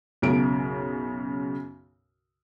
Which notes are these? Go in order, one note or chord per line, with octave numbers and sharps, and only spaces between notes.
B1 F#2 C#3 D7